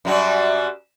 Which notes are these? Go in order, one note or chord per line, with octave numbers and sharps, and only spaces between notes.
F#2 F#3 G3